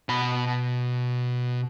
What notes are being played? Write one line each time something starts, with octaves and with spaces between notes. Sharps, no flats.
B2 B5